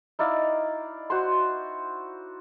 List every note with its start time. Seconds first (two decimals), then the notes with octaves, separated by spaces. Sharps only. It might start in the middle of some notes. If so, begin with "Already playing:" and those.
0.19 D#4 E4 D5 F5
1.10 F#4 C5 C6